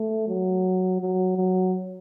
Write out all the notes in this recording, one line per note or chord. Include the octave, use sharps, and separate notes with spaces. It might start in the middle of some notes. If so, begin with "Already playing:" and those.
Already playing: A3
F#3
F#3
F#3